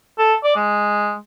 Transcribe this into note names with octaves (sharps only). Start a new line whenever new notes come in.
A4
D5
G#3